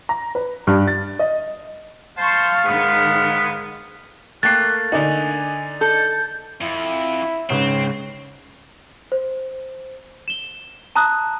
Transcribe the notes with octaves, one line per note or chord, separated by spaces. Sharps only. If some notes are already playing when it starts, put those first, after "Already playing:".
A#5
B4
G2
A6
D#5
C5 F5 A5 C6 C#6
G#2 D#3 G#3 B3
A3 A#3 G5 F#6 A6 C7
D3 D4 D#4 G#5
A4 G6
F2 E4
G#2 C#3 C4 B4 C#5
C5
E7 G7
A5 A#5 D#6 F#6